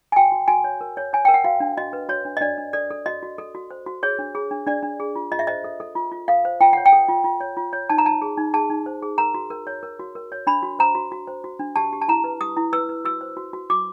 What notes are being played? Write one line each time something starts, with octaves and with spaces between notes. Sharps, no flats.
G#5
F#4 G5
F#4
F#4 G#5
C#5
A#4
C#5
C#5 G#5
A#4 G5
F#5
F#4 F5
D4
F#4 D#5
B4
F#4 C#5
D4
D#5
D4 D5
D4
A4 D5
A4
F#4 D#5
F#4
A4
F#4
C5
F#4
G#4 C#5
D4
G#4
D4
D4 D5
D4
G#4
F4
F4 D#5
E5
C5 D#5
A4
A4
F4
F4
A4 F5
C5
F4 G5
C#5 F#5
G5
A4
F4
F4
C#5
F4
C#5
D#4 A5
A#5
D#4 A5
G#4
D#4
G#4 A5
D#4
C5
G#4
A#4 A#5
F#4
A#4
C#5
A#4
F#4
A#4
C#5
D4 B5
F#4
C5 A#5
F#4
F#4
C5
F#4
D4
G4 A5
G4
A5
E4 A#5
B4
G4 D#6
E4
B4 E6
B4
F#4 E6
C5
F#4
F#4
F#4 D6